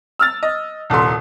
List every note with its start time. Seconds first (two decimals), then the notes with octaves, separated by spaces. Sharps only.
0.19 E6 F6 A6
0.43 D#5
0.90 D#1 C2 A4 C6